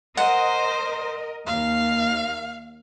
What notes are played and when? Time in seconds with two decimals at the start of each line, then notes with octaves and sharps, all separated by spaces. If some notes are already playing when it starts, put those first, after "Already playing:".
0.17 A#4 C5 D#5 F#5
1.47 D#2 F5